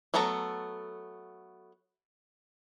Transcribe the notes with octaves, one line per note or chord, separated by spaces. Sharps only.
F#3 A3 B3 A4 A#5